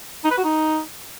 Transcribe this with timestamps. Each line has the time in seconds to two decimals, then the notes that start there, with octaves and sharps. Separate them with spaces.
0.25 D#4
0.31 B4
0.38 F#4
0.44 D#4